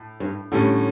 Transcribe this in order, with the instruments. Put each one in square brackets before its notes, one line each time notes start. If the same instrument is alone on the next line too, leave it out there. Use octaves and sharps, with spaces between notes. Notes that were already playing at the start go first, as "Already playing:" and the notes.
Already playing: [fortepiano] A2
[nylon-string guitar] G2
[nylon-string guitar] A2 [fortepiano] D3 G3 C#4